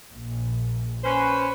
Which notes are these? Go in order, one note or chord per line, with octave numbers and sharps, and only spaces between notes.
A#1
C#4 B4 C5